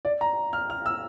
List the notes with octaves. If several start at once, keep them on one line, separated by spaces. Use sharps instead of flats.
D5
A#5
F6
F6
E6